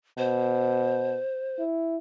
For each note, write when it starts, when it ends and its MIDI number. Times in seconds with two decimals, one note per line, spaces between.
0.18 1.19 47
0.18 1.62 72
1.59 1.98 64